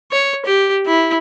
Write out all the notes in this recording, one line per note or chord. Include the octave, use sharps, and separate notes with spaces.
C#5
G4
E4